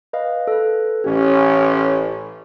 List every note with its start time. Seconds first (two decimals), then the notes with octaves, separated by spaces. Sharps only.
0.13 B4 D#5 F5
0.47 A4 B4
1.04 A1 C#4 G4